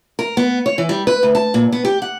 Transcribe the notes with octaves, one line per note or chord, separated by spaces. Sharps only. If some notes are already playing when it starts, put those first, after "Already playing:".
A#4
B3
C#5
E3
G3
B4
D2
A5
A#2
B3
G4
F#5